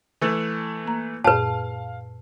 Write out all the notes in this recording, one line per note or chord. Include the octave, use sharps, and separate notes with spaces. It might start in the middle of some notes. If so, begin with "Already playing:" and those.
E3 A3 A4
A#3 A#5
F#2 A#2 G#4 B4 F5 A5